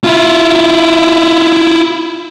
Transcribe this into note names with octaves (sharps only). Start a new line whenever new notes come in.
E4 F4